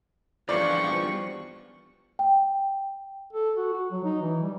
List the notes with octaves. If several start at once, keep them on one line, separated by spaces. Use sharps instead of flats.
E2 G2 F3 D5 C#6
G5
A4
F#4
F#4
F#3
D#4
E3
G3